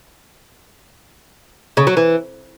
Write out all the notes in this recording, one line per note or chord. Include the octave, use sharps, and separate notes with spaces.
C#3
F#3
E3